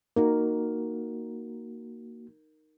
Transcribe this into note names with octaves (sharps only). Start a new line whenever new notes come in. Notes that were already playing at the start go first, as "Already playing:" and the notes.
A#3 D#4 F#4 A#4